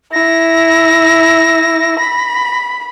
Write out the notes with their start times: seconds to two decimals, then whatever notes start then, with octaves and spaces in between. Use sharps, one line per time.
0.13 E4 A#6
1.99 B5